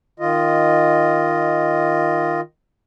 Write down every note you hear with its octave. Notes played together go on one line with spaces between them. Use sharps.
D#3 F4 D#5